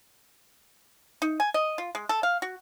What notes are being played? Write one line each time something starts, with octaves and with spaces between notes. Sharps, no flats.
D#4
G#5
D#5
F4
G#3
A4
F5
F#4